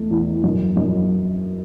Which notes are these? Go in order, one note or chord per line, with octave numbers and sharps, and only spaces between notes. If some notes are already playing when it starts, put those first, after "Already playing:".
Already playing: E2 A3
E2
F#2
F#2